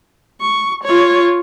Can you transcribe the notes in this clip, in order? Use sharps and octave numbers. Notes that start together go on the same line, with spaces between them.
C#6
F4 C#5